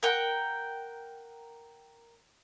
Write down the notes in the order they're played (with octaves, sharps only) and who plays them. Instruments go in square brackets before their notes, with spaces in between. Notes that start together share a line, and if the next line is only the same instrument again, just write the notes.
[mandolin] A#4 F#5 G5